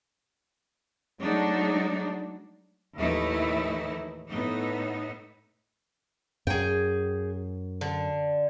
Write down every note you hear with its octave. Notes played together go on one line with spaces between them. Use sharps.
F#3 G#3 A3 D4 D#4
D#2 A2 E3 A3 D#4 E4
A2 B3 D#4
F#2 G#4 G5
D3